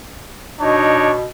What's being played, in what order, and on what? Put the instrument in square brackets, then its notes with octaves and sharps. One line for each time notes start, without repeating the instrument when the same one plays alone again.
[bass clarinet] B2 [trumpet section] D4 D#4 C#5